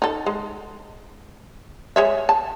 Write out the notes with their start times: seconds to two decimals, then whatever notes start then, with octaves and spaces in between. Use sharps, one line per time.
0.02 D#4 A4
0.26 G#3
1.96 G#3 C#5 E5
2.29 A5